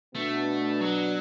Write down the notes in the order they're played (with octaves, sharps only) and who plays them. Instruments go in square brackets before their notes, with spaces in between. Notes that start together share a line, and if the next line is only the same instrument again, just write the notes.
[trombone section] B2 B3 D4 [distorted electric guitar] A3
[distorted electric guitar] F#3